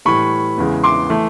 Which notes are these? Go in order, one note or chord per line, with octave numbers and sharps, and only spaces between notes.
A2 E3 G3 B5 C#6
E2 C#3 E3 G#3
C6 D6
E3 A3